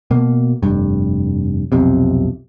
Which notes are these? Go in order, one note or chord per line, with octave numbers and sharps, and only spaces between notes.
B2 A#3
F1 G2
B1 F2 C3